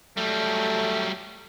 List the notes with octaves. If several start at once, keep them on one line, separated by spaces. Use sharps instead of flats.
F#3 G3 A3